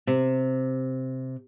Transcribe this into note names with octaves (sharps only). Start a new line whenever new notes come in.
C3